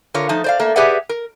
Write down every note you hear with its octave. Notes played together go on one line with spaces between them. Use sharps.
D3 F4 A#4 C#5
F3 A3 D#4 A5
C5 D5 F5
A3 A#3
G4 G#4 B4 D5 E5 F#5
A#4